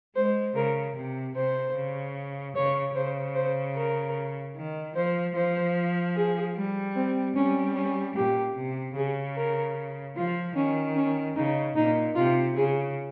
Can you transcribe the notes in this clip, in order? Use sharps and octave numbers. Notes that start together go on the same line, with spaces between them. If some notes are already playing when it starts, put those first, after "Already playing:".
G#3 C5
C#3 A#4
C3
C3 C5
C#3
C#3 C#5
C#3 C5
C5
A#4
D#3
F3 C5
F3 C5
G#4
G3
C4
G3 C#4
C#4
A#2 G4
C3
C#3 G#4
A#4
F3 F4
D#3 C#4
C#4
C#3 D#4
A#2 D#4
C3 F4
C#3 G#4